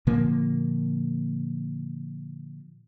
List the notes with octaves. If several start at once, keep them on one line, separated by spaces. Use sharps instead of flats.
A#2 D3 F3 A#3